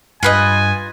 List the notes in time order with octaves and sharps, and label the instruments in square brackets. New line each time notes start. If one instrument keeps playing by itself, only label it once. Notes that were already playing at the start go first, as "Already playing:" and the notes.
[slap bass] G2 [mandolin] F4 B4 D#5 [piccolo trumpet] G#5